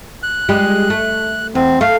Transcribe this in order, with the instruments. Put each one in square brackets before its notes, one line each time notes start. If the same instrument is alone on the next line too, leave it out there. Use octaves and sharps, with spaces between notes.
[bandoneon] F#6
[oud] G3 G#3 G4
A3
[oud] E2 [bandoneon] C4
[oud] A3 [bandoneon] F5